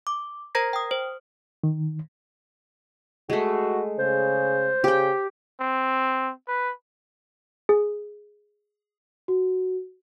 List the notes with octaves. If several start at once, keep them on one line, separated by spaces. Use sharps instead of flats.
D6
A#4 C5 A#5 G#6 A#6
G5 D#6
C5
D#3
G#3 A3 F#4
C#3 C5
C#3 G4 G5
C4
B4
G#4
F#4